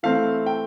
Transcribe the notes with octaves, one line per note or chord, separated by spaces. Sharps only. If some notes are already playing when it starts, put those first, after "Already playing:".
E3 A3 C4 F5
G5